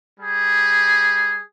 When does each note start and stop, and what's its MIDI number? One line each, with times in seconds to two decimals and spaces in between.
0.20 1.42 55
0.20 1.42 68